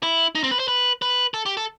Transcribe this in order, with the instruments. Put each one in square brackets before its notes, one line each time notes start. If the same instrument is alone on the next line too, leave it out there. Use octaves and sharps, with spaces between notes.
[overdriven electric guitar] E4
D#4
C4
B4
C5
B4
B4
A4
G4
A4